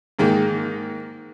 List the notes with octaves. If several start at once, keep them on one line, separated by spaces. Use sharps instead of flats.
G#2 D#3 G#3 A#3